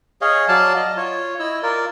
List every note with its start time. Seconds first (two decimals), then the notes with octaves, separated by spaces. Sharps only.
0.21 G#4 C#5 D#5 F5
0.48 F#3 D5 F5 A5
0.76 D#5
0.97 F4 C#5
1.40 E4 D#5 E6
1.63 F4 A#4 D5